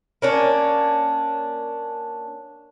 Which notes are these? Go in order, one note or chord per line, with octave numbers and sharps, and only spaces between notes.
A#3 C#4 D4